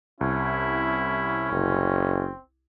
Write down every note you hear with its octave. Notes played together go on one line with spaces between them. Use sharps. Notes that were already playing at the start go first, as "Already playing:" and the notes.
C2 C#4 E4
F#1 C4